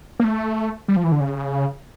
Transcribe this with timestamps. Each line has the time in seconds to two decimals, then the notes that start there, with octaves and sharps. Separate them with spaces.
0.20 A#3
0.24 A3
0.88 G3
0.96 F3
1.04 E3
1.12 D3
1.20 C#3